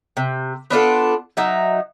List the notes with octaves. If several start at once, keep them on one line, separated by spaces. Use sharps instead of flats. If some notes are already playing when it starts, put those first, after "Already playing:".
C3
B3 D4 F4 A4
F#3 D#4 E5